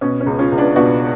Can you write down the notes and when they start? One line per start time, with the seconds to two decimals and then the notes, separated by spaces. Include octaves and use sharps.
0.01 B2 C#4
0.21 C#4
0.26 C#2
0.39 C#4 F4
0.52 C#2
0.58 B3 D4
0.76 B2 D4 F#4